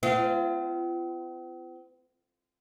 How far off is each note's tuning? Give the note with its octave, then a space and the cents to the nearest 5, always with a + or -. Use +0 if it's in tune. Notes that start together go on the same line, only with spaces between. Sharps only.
C4 -45 F4 -35